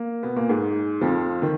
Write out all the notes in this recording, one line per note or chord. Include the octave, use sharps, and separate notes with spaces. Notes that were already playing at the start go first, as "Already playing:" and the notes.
Already playing: A#3
B2 B3
A#2 A#3
G#2 G#3
F2 F3
D#3